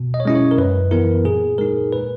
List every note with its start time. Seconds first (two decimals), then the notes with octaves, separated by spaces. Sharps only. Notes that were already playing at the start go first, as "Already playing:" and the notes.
Already playing: B2
0.14 D#5
0.20 C#5
0.25 G#3 C#4 E4 D#5
0.35 C#5
0.51 A#4
0.58 F#2 B4
0.91 E3 B3 E4 A#4
1.25 A#2 G#4
1.58 G#3 D#4 A#4
1.92 A#2 B4